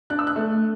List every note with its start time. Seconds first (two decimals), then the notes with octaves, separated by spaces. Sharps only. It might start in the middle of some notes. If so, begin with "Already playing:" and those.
0.10 D4 F#6
0.19 E6
0.27 F#6
0.36 A3